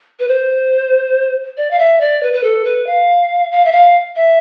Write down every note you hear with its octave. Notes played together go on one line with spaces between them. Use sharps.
B4
C5
D5
F5
E5
D5
B4
B4
A4
B4
F5
F5
E5
F5
E5